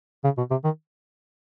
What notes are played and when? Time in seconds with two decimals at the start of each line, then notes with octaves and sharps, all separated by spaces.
0.24 C#3
0.38 B2
0.51 C3
0.64 D#3